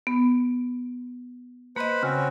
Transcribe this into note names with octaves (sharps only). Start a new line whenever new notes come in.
B3
A#3 B4 C5 D#5 B5
C#3 C4 C#4 F#4